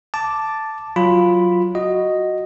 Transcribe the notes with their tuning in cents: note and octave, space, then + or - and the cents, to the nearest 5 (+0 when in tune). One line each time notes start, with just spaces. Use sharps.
A5 +0 D6 +0
F#3 +0 F4 +0 B5 +0
F#4 +0 D#5 +0